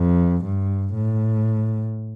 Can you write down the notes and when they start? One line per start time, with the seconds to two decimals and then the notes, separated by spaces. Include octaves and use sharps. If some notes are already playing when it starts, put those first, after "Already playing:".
Already playing: F2
0.44 G2
0.95 A2